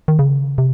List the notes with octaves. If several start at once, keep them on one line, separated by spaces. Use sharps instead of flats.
D#3
C#3
C3